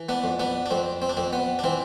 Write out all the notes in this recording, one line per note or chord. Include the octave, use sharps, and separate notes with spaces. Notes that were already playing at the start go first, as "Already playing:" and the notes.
Already playing: E3
B3 D4
F2
B3 D4
D4
F2 C4
C4
D4
F2 C4
B3
D4
E3 C4